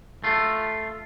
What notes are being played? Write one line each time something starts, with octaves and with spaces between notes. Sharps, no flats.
A3 F4